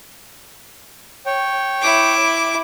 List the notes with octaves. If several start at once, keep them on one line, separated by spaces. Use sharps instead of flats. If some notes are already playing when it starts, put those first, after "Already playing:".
C#5 G5
E4 D6